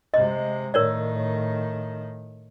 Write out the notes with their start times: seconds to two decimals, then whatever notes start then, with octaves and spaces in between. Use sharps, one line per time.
0.14 C3 G#3 D#5
0.74 A2 D#3 A#4 C#5 D5